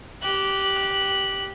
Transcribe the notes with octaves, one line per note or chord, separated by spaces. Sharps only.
G4 F#6